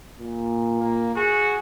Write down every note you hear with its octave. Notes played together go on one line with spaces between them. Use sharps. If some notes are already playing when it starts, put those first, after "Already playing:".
A#2
A#3
F#4 G#4